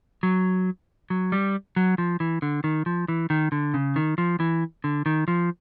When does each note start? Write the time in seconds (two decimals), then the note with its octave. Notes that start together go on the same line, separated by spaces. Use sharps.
0.23 F#3
1.10 F#3
1.32 G3
1.76 F#3
1.98 F3
2.20 E3
2.42 D3
2.64 D#3
2.86 F3
3.08 E3
3.30 D#3
3.52 D3
3.74 C#3
3.96 D#3
4.18 F3
4.40 E3
4.84 D3
5.06 D#3
5.28 F3